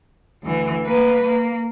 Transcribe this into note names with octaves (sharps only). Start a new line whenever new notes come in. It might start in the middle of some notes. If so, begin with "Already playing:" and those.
D2 E3
A#3 B4
A#3